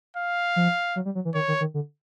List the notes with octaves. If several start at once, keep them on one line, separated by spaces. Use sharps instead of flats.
F5
F3
F#3
G3
F#3
E3
D#3 C#5
D#3
D#3
D3